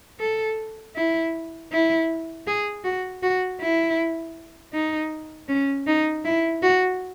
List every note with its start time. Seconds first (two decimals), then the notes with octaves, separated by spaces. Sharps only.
0.20 A4
0.96 E4
1.72 E4
2.47 G#4
2.84 F#4
3.23 F#4
3.60 E4
4.74 D#4
5.48 C#4
5.87 D#4
6.25 E4
6.63 F#4